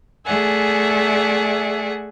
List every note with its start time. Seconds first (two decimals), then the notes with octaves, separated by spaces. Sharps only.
0.24 A3 G#4 D5 E5 F#5 G#5